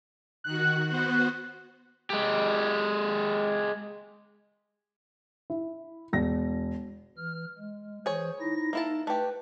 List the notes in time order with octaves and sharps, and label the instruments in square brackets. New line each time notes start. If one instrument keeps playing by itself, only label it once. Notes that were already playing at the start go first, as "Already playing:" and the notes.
[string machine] D#3 F#4 [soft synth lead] F#6
[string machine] B3 F#4 C5
[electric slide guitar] G#3 G4
[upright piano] E4
E1 A#6
[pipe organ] E3 F6
G#3
[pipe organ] E3 C5 [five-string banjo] G#4 C#5
[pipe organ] D#4 E4 A#6
[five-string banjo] A#3 E4 A5 [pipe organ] D#4
[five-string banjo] A3 G4 [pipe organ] B4